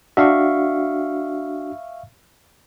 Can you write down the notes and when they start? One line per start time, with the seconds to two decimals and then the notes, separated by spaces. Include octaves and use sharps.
0.17 D4 F#4 E5 F5 C#6